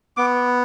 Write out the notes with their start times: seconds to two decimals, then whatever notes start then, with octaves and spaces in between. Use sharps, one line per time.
0.17 B3 D6